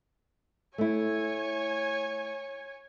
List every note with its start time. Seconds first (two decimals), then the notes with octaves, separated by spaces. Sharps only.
0.78 A3 E4 C#5 G#5